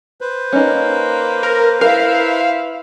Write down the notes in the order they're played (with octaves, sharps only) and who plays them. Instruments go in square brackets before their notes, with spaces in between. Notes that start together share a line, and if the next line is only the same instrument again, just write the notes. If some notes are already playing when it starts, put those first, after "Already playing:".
[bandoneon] B4 C5
[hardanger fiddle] A#3 [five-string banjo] C#4 D#4
[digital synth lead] A#4
[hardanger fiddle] E4 E5 [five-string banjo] A#4 [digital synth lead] F5